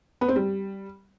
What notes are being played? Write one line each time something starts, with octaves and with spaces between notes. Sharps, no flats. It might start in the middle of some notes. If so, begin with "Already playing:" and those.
B3
C4
G3